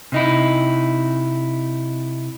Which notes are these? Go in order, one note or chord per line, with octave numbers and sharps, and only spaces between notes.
C3 D#4 E4